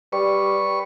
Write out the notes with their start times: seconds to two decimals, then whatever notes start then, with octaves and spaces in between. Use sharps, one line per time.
0.13 G3 B4 C#6